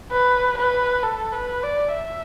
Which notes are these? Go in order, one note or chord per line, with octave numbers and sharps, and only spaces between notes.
B4
B4
A4
B4
D5
E5